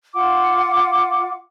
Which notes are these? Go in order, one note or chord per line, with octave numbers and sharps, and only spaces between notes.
F4 F5 F#5 D6